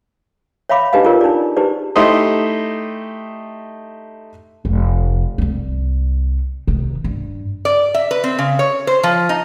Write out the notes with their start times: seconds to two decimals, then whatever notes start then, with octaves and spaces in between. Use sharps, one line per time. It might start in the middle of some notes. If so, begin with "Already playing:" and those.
0.69 C#5 E5 F5 B5 D6
0.93 D4 D#4 G4 B4 D#5 F5
1.05 F4 G#4 A#4 B4 C#5
1.21 D4 D#4 G#4 D5
1.56 D#4 G4 G#4 B4 C5 D5
1.96 A3 D#4 E4 G4 C5 D#5
4.65 F1
5.38 C2 G3
6.67 C3 D#3
7.04 G2
7.65 D5
7.94 E5
8.11 B4
8.24 C4
8.39 C#3
8.59 C#5
8.87 C5
9.03 F3
9.29 D#4